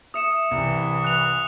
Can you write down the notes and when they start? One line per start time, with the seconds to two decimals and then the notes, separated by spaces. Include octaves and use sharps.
0.14 E5 D#6 C#7 E7
0.51 C2 E3
1.04 F#6 F7